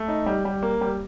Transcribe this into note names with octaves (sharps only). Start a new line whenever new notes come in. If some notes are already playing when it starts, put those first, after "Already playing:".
Already playing: A3
D#4
G3
G3
A#3
G3